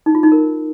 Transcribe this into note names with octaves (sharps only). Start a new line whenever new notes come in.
D#4
F4
D#4
A#4